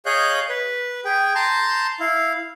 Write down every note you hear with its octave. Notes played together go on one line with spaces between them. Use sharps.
G#4 C#5 D#5 F5 F#6 G6
B4
G#4 G5
A5 A#5 C6 G6
E4 F5